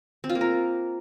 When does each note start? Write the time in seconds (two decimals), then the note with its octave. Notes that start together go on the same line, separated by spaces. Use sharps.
0.24 C4
0.30 F4
0.35 A#3
0.41 A#4